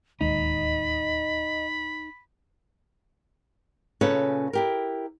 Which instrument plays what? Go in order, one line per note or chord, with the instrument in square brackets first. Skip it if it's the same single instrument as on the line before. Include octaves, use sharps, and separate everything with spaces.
[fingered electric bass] D1 D#2 G#3 [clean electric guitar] D#4 [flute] D#5 [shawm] B5
[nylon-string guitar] A#2 C#3 C#4 A4 B4 C#5
E4 G4 A#4